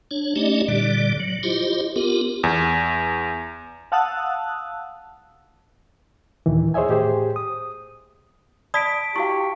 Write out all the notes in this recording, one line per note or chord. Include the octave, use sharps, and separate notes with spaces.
D4 C#5
A3 C#4 D#4 G4 D5 D#5
A#2 D3 G3 D5
F#3
E4 F4 G4 C5 D#5
B3 F4 G4 A#4
E2
F5 F#5 A5 D#6 E6 F#6
D#2 A#2 D#3 E3
G#4 C5 C#5 D#5 E5 G#5
A2 G4 G#4 C5
D#6
D5 A5 B5 D#6 B6 D7
E4 F#4 G4 F5 C#6